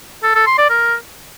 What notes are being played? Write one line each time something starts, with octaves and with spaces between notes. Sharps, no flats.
A4
A4
C6
D5
A#4